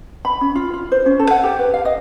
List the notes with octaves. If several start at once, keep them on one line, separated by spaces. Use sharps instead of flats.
B5
C#4
F4
F4
C5
C#4
A4
F#5
G4
B4
F5
D#5